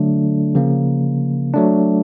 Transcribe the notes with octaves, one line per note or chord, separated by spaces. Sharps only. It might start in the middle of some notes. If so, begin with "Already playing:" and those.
Already playing: D3 F#3 A3 D4
C#3 F3 A#3
F#3 A3 D4